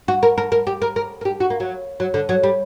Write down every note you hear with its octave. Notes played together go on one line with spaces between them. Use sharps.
F#4
A#4
A#4
A#4
G4
A#4
A#4
A#4
G4
F#4
A#3
F#3
F#3
D3
F#3
G3